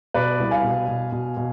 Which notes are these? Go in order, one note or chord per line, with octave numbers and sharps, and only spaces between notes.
B2 B4 D5
C2
F5 G#5
B2
B2
B2
B2